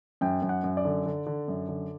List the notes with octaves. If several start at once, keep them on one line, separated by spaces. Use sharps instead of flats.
F#2 G5
F#2
F#5
F#2
D5
D3
D3
D3
F#2
D3